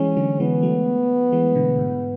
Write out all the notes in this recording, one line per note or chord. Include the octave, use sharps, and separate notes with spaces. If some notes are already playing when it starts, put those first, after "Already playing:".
Already playing: E3 G#3 C#4
D3 F#3
E3 G#3 B3
F#3 A3
E3 G#3
B2 D3
G#2